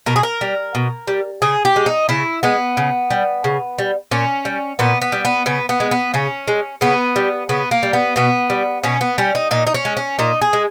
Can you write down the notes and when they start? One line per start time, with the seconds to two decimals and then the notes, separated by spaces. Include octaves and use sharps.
0.06 B2 A#4
0.16 G#4
0.23 A#4
0.41 G3
0.75 B2
1.07 G3
1.42 C#3 G#4
1.65 G4
1.76 G#3
1.86 D#4
2.09 C#3 E4
2.43 G#3 B3
2.77 C#3
3.11 G3
3.44 C#3
3.79 G3
4.11 A#2 C#4
4.45 G3
4.79 A#2 B3
5.02 B3
5.12 G3
5.25 B3
5.46 C#3 B3
5.69 B3
5.80 G#3
5.91 B3
6.14 C#3 C#4
6.48 G#3
6.81 C#3 B3
7.16 G3
7.49 C#3 B3
7.71 A#3
7.83 G3
7.93 B3
8.16 B2 B3
8.50 G3
8.84 B2 C#4
9.01 B3
9.18 G3 C#4
9.35 D#4
9.51 A#2 D#4
9.67 D#4
9.74 C#4
9.85 G#3
9.97 C#4
10.19 A#2 D#4
10.41 G#4
10.53 G#3